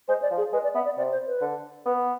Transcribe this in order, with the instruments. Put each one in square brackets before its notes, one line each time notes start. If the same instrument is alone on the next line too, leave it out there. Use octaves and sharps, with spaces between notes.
[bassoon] G#3 [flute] C5
[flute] D5
[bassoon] F3
[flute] G#4
[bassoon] G#3 [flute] B4
[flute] D5
[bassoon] B3 [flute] E5
[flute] D5
[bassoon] C3 [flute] D5
[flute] C5
B4
[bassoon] D3
[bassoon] B3 [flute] B4